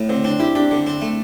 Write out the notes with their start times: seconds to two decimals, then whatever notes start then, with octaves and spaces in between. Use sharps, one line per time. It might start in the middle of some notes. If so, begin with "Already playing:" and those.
Already playing: A2
0.09 D3 C4
0.24 C4 D4
0.39 E4 G4
0.55 D4 G4
0.71 D3
0.87 C4
1.01 A3